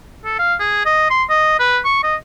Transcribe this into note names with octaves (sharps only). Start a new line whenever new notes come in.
A4
F5
G#4
D#5
C6
D#5
B4
C#6
D#5